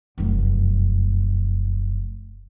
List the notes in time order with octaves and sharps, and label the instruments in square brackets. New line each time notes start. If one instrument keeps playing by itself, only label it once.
[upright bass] F1 F#2